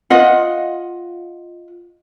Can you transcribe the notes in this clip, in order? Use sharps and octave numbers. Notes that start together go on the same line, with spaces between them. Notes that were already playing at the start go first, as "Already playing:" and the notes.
F4 D#5 F#5